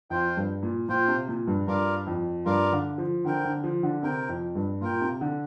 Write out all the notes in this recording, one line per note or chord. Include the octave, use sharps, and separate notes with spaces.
F2 F4 C5 G5
G2
A#2
A#2 F4 C5 G5
C3
A#2
G2
G2 F4 A#4 D5 F5
F2
G2 F4 A#4 D5 F5
D3
F3
D3 C4 A#4 G5
D3
F3
D3
C3 C4 A#4 G5
F2
G2
A#2 F4 A#4 G5
C3
D3